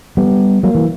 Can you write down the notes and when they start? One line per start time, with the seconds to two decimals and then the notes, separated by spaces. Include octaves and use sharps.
0.17 G3 B3
0.63 F#3 A#3
0.75 E3